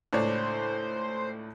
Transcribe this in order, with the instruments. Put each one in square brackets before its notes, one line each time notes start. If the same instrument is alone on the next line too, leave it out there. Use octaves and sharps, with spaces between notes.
[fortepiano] C#2 D4 C#5 [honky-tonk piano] A2 [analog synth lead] C5